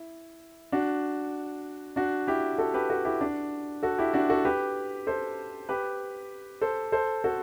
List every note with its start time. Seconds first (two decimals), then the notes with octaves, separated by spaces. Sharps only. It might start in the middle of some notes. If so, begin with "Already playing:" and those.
Already playing: E4
0.72 D4 F#4
1.96 D4 F#4
2.27 E4 G4
2.58 F#4 A4
2.74 G4 B4
2.90 F#4 A4
3.05 E4 G4
3.21 D4 F#4
3.83 F#4 A4
3.98 E4 G4
4.14 D4 F#4
4.30 F#4 A4
4.45 G4 B4
5.07 A4 C5
5.69 G4 B4
6.62 A4 C5
6.92 A4 C5
7.24 F#4 A4